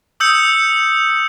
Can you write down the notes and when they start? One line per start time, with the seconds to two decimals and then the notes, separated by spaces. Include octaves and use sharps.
0.20 D#6 E6 G6 C#7